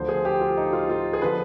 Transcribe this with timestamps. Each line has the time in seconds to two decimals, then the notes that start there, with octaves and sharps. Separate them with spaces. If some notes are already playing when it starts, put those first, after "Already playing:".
Already playing: D2 D3 F3 C5
0.08 G#4
0.25 G4
0.41 F4
0.57 D#4
0.73 F4
0.89 F4
1.13 G#4
1.22 D3 F3 B4